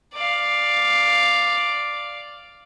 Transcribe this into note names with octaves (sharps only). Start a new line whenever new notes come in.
D5 F5